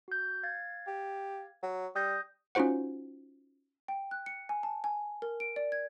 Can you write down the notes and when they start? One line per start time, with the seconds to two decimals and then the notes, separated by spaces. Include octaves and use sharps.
0.08 F#4 G6
0.43 F5 G#6 A6
0.87 G4
1.63 F#3
1.96 G3 D#6 G6 A#6
2.55 C#4 D#4 F4 F#4 C5 F#5
3.88 G5
4.11 F#6
4.26 C#7
4.49 G#5
4.63 A5
4.84 G#5
5.22 A#4
5.40 D7
5.56 D5
5.72 G#6